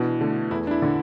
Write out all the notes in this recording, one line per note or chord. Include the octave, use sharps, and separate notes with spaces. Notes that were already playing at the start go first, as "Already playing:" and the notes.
Already playing: B2 E3 D4
D3 A3
E2 E4
D4
E4
D3